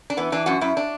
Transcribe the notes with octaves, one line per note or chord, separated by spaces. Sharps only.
D4
E3 B3
E3 D4
F#2 F#4
F#2 E4
D4